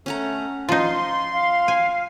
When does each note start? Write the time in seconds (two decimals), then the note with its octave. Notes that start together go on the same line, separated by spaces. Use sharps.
0.06 A3 C#4 F#5 A#5
0.69 F3 D#4 F4 C6
1.33 F5
1.68 G#5